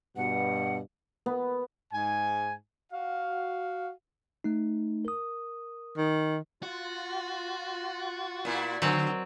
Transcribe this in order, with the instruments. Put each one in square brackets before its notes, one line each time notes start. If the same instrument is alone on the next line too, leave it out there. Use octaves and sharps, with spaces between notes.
[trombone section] G2 B2 [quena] F#5
[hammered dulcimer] B3
[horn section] G#2 G#5
F#4 F5
[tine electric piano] A3 D#4
A#4 D#6
[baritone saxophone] D#3
[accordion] F4 [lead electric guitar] F#4
[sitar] A#2 A#3 E4
[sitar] D3 [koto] F#3 C4